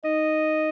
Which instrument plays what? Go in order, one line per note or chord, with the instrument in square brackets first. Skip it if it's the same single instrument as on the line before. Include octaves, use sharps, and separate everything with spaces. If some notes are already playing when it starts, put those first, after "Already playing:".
[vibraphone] D#4 [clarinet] D#5